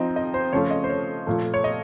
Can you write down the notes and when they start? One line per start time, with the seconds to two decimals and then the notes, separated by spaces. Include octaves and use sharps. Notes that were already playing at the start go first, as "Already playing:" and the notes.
Already playing: F3 C4 D#4 D#5
0.16 D#5
0.34 C5
0.53 C#3 F3 A3 C#4 F4 C#5
0.71 D#5
0.84 C5
0.89 C#5
1.27 A#2 F3 A3
1.54 C#5
1.64 D#5